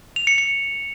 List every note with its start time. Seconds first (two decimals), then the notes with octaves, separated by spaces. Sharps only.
0.16 F7
0.27 C#7
0.38 C#7